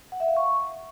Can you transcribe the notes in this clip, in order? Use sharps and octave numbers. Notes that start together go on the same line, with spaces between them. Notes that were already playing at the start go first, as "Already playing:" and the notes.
F#5
E5
F5
C#6